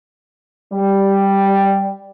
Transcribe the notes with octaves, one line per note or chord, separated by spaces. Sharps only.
G3